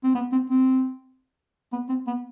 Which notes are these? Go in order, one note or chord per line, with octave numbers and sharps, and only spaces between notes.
C4
B3
C4
C4
B3
C4
B3